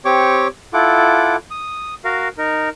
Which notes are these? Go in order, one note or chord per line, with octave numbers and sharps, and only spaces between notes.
C4 G4 C#5 C#6 D6
E4 F4 A4 F#5 D6
D#6
F#4 A#4 F5
D#4 A#4